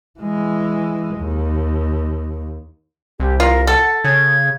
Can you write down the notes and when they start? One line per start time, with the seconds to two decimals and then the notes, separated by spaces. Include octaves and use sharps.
0.20 E3 G#3
1.16 D#2
3.20 C2 G4
3.40 F4 A#4
3.67 A4 F#5
4.04 C#3 G#6